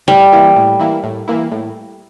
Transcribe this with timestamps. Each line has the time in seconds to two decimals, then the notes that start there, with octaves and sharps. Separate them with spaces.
0.07 A2 G3
0.33 E3 A#3 E4
0.56 A2
0.79 E3 A#3 E4
1.03 A2
1.28 E3 A#3 E4
1.51 A2